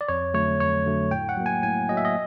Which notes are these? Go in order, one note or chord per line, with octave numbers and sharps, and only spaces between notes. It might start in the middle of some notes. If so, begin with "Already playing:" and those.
D5
F2 C#5
D3 F#3 A3 C#5
F2 C#5
D3 F#3 A3
A2 G5
F#5
F#3 A#3
G#5
A2 G#5
F#3 A#3 D#5
E5
D#5